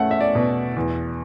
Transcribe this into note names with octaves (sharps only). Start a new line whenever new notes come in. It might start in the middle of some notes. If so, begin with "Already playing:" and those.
Already playing: E2 A3 C#4 F#5
E5
D5
B2
E2